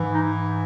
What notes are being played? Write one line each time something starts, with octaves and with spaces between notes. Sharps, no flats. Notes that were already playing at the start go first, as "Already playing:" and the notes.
Already playing: G#2 E3
D#4